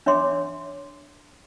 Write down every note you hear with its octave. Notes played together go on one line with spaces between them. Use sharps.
D4 C#5 E5 C6 D6